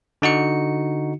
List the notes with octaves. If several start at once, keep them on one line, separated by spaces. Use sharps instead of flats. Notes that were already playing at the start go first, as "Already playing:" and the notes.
D3 D#4 F#4 C#7